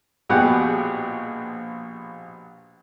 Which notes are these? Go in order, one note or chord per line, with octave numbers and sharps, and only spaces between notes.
A#1 B2 G3 G4 G#4 F#5